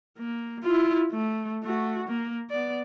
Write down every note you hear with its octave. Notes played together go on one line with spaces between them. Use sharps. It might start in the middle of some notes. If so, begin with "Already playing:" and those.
A#3
E4 F4
A3
A3 F#4
A#3
B3 D5